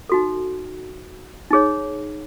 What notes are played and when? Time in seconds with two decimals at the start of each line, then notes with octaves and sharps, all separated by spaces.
0.09 D#4 F#4 A4
1.51 D#4 G#4 C#5